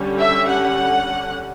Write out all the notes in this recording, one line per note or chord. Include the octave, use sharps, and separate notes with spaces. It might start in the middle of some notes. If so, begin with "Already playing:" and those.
Already playing: D3 G3 C#4
E5
F#5